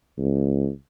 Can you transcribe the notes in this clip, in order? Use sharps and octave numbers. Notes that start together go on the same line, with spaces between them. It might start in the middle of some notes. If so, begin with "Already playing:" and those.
C#2